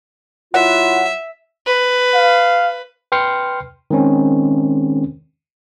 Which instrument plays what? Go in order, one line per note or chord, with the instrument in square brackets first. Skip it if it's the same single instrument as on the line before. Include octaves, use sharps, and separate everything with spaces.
[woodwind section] F#3 E4 F4 [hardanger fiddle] E5 [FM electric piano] F#5
[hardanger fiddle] B4
[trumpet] F5
[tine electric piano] B4 G5 C6 F6 C7 C#7
D#3 G#3 C4 C#4